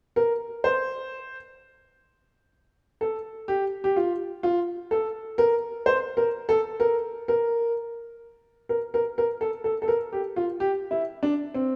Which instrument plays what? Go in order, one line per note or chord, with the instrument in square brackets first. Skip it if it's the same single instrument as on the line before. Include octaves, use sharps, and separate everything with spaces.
[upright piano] A#4
C5
A4
G4
G4
F4
F4
A4
A#4
C5
A#4
A4
A#4
A#4
A#4
A#4
A#4
A4
A4
A4
A#4
G4
F4
G4
E4
D4
C4